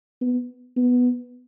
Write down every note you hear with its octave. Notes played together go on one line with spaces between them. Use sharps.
B3
B3